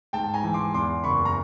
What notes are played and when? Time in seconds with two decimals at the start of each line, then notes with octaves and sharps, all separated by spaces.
0.13 G#2 G5 A5
0.34 G#5 A#5
0.44 E3
0.54 C6 D6
0.74 E2 C6 D6
1.04 F#1 B5 C#6
1.25 A#5